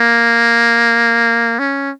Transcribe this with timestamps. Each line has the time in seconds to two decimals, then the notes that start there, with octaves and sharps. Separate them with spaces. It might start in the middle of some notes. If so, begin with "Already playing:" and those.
Already playing: A#3
1.59 C#4